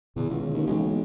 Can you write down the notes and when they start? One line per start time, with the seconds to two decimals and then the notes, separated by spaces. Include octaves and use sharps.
0.16 E2 B2 D3 D#3
0.29 C#2
0.54 D#2
0.67 B1 E3 G#3 A#3